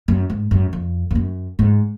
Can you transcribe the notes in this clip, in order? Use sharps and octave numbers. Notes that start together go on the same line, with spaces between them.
F#2
G#2
F#2
F2
F2
F#2
G#2